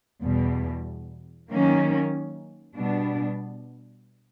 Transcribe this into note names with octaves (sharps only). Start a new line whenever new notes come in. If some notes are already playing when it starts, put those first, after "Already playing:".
E2 B2 G3
D#3 F#3 A#3 C#4
B2 G3 B3 D4